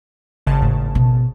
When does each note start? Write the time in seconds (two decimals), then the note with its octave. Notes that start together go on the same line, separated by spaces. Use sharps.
0.46 G#1 C#3 A5
0.62 A2
0.95 B2